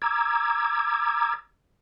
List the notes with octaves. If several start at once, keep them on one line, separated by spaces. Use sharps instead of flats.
A#5 D6 E6 G#6